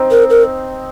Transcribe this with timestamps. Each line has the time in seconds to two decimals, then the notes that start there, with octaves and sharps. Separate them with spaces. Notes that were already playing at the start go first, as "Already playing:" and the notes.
Already playing: C4 D#4
0.11 A#4
0.30 A#4